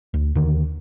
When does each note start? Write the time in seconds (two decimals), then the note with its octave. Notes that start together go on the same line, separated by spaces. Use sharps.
0.14 D2
0.35 D#2 D3 D#3